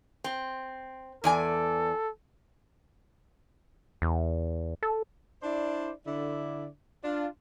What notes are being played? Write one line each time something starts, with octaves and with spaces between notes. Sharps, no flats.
C4
E2 A4 D5 G#5
E2
A4
D4 E4 C5 D5
D3 E4 D5
D4 F4